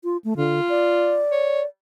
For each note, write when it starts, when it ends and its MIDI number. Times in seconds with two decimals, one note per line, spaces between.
0.04 0.17 65
0.24 0.33 57
0.37 0.60 50
0.37 1.21 65
0.69 1.65 74
1.31 1.61 73